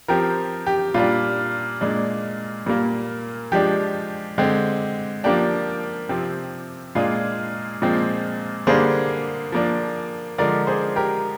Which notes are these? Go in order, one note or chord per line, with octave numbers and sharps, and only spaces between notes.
F3 C4 G4 A#4
G4
A#2 G3 D4 F4
A#2 G#3 D4
A#2 G3 A#3
F3 G#3 D4 G4
D3 G#3 C4
F3 A#3 D4 G4
C3 F3 C4
A#2 G#3 D4 F4 G#4
A#2 F3 G#3 C4
D3 G3 A#3 D4 G#4 C5
F3 A#3 D4
D3 F3 G#3 A#4 D5
G#4 C5
G4 A#4